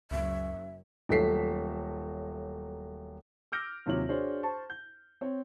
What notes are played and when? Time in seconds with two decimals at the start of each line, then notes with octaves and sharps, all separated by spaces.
0.11 F#1 C#2 F#2 E5
1.09 D#1 F#3 A3 A4 B6 C7
3.52 D6 E6 F6 G6 A#6 D7
3.86 D#2 C3 F#3 F4 C#5 F#7
4.09 D4 F#4 G#4 C5 C#5
4.43 C5 A5 C#6
4.70 G6
5.21 C4 C#5